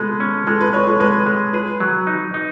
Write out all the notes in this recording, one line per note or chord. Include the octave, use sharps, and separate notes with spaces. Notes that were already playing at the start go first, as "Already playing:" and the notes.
Already playing: G#3 B3 A4 B4
C#4
G#3 A4
B4
G#3 C#5
A4
G#3 B4
G#3
G#4 B4
F#3
D#4
D#4